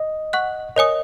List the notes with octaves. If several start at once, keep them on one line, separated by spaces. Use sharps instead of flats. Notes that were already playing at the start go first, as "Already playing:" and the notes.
Already playing: D#5
F#5 C#6 F#6
A#4 C#5 D#5 G#5 D#6